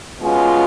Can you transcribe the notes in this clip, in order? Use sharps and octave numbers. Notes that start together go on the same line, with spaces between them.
B2 G#3 C#4 F4